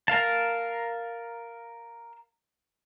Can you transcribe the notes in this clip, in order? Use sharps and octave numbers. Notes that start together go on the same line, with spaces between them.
A#4 F5 A5